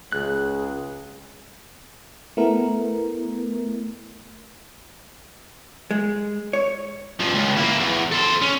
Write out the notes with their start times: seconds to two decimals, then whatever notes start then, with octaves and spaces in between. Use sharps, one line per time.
0.12 C#2 G#4 F#6
2.37 A3 B3 E4 A#4
5.91 G#3
6.53 C#5
7.20 G2 F3
7.35 C#2
7.57 A#3 E4
7.80 E2
8.12 A4 C5
8.42 C#4